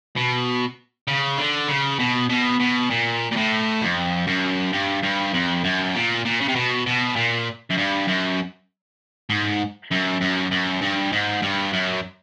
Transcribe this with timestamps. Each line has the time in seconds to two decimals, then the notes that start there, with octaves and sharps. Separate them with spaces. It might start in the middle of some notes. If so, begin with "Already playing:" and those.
0.16 B2
1.07 C#3
1.38 D3
1.68 C#3
1.99 B2
2.29 B2
2.60 B2
2.90 A#2
3.31 A#2
3.36 A2
3.81 F2
4.27 F#2
4.73 G2
5.03 G2
5.34 F2
5.64 F#2
5.95 A#2
6.25 A#2
6.41 C#3
6.48 C3
6.55 B2
6.86 B2
7.16 A#2
7.70 F#2
7.78 G2
8.08 F#2
9.30 G#2
9.91 F#2
10.21 F#2
10.51 F#2
10.81 G2
11.12 G#2
11.42 G2
11.73 F#2